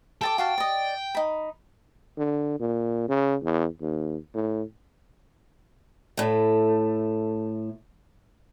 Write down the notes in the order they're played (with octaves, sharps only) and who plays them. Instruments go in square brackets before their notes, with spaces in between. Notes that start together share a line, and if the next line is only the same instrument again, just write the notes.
[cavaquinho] A4 A5 D6 [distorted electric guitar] G5
[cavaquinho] F#4 F5 A5
D5 D#5
D#4 B5
[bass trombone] D3
A#2
C#3
E2
D#2
A2
[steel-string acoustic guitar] A2 A3